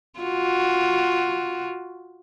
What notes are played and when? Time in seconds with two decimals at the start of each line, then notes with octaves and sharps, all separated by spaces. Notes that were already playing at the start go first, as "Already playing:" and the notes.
0.19 F4 F#4